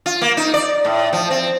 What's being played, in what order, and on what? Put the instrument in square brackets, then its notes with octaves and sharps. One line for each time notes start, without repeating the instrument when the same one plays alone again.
[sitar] F4
A#3
D#4
D5
A2
F3
C4